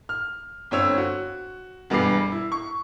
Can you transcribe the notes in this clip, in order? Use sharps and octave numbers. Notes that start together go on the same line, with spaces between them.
F6
G1 C4 C#5 E6
F#4
E1 G2 B3 D6 C7
E4
C#6